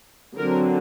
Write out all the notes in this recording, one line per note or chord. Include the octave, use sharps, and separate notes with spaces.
D3 F#3 C4 A#4